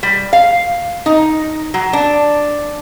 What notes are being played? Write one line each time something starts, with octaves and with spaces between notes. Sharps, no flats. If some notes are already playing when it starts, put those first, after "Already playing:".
G3
F5
D#4
F#3
D4